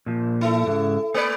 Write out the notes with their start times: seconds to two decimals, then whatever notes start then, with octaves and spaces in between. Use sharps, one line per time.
0.06 A#2 F3
0.41 E4 A4
0.67 G#2 C#3
1.14 A3 A#3 B4 D5